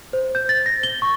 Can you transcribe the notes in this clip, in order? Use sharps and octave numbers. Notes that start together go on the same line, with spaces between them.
C5
G6
A6
A#6
G7
C#6